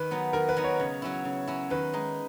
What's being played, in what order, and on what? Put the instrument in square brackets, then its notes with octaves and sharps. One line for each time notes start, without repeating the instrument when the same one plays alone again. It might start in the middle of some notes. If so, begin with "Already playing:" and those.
Already playing: [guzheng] D#3 [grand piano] B4
[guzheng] F#3 B3 D#4
[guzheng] D#3 [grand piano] A#4
[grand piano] B4
[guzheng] F#3 B3 D#4
[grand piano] C#5
[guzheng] C#3
F#3 C#4 E4
C#3
F#3 C#4 E4
[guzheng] D#3 [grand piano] B4
[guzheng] G#3 D#4